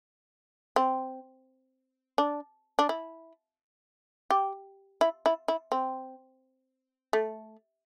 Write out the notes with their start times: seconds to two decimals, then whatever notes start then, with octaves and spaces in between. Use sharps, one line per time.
0.76 C4
2.18 D4
2.79 D4
2.89 E4
4.31 G4
5.01 E4
5.26 E4
5.48 E4
5.72 C4
7.13 A3